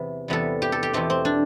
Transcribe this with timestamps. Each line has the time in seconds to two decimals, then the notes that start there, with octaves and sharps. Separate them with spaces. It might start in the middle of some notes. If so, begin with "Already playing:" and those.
Already playing: E2 C3 E3 B3
0.28 E2 C3 G3 B3 A4
0.62 G4
0.72 A4
0.83 G4
0.93 E2 B2 A3 C4 G4
1.10 C4
1.25 D4